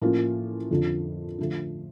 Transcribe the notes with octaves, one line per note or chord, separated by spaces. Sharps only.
A2 F3 A#3 C#4 F4
F2 D3 F3
D3 F3 A3